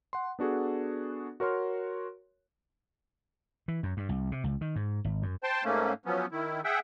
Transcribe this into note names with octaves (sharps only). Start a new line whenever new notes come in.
F#5 C6
B3 D4 F#4 G#4 A4
F#4 A#4 C#5 C6 F6
E3
F#2
G2
C2
C3
C#2
D#3
G#2
G#1
F#2
C5 G5 A5 C6
G#2 A3 A#3 C#4
F3 F#3 B3 C#4
D#3 E4
G#4 E5 F#5 G5